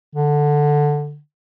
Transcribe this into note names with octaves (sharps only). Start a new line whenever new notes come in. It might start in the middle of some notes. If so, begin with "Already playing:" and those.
D3